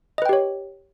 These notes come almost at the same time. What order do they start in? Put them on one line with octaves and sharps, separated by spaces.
D#5 B4 G5 G4 C#5